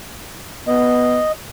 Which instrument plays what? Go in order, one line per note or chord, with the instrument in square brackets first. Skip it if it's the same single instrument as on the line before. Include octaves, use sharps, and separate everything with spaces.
[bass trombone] B3 [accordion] D#5